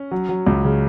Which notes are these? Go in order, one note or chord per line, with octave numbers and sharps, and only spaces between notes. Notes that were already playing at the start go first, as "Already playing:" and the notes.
Already playing: C#4
F#3
F#3
C#2
C#3